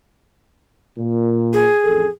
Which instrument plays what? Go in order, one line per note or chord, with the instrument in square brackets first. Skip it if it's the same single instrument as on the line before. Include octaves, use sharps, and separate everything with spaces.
[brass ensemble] A#2
[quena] G#4
[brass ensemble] A1 F2 A4